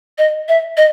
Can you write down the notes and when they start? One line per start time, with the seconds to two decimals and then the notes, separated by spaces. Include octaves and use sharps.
0.18 D#5
0.48 E5
0.77 D#5